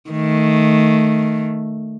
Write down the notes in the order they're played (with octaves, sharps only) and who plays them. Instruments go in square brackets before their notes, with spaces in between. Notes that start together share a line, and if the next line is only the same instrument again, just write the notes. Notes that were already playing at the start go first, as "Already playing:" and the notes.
[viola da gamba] D#3 A3